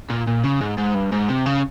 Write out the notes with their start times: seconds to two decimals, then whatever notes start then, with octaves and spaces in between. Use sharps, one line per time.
0.10 A#2
0.27 A#2
0.44 C#3
0.61 G#2
0.78 G#2
0.95 G2
1.12 G#2
1.28 C3
1.46 C#3